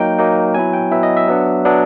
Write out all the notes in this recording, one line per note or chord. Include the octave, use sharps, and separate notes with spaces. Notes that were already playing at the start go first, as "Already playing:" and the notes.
Already playing: F#3 A#3 D#4 G5
F#3 A#3 D#4
F#3 B3 E4 G#5
G5
F#3 B3 E4 E5
D#5
E5
F#3 B3 D4
F#3 B3 D4